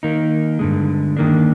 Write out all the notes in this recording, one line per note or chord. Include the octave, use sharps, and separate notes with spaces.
D#3 A#3 D#4
G2 D3 G#3
D#3 A#3 D4